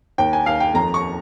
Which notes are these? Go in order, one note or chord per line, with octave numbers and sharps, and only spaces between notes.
D#2 G5
G#5
D#2 F5
G5
F2 A#5
C#6